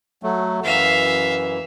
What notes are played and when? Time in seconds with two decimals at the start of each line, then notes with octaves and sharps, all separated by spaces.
0.23 F#3 A3
0.64 F#2 E3 E5 F5